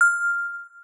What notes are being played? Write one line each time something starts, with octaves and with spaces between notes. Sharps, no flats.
F6